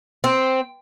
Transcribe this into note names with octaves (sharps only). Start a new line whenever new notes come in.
C4